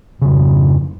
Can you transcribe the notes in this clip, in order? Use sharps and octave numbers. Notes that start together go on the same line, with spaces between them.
F2 G#2 C#3